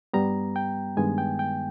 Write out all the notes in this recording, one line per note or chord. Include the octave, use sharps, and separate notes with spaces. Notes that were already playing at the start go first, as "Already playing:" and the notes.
G2 G3 B3 A#5
G5
G2 D#3 G#3 B3 G#5
G5
G5